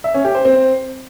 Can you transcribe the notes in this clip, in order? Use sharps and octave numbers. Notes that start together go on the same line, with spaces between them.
E5
C#4
G4
C5
C4